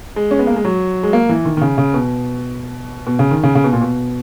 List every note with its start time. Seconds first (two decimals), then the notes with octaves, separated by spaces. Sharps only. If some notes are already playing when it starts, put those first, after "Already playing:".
0.16 G#3
0.31 C#4
0.39 B3
0.47 A#3
0.56 G#3
0.65 F#3
1.03 G#3
1.13 A#3
1.29 E3
1.45 D#3
1.57 D#3
1.61 C#3
1.78 C#3
1.94 B2
3.07 B2
3.19 C#3
3.31 D#3
3.43 C#3
3.55 C#3
3.64 B2
3.73 A#2
3.82 B2